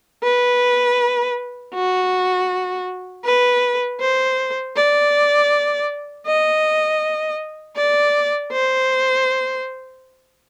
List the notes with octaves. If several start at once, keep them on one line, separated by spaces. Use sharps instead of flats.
B4
F#4
B4
C5
D5
D#5
D5
C5